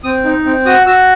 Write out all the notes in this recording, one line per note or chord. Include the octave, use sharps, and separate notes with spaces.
C4 D#6
D#4
C4
F#4 D#6
F#4 E6